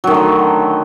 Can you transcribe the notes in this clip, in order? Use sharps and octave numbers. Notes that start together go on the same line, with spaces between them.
D3 D#3 F#3 A3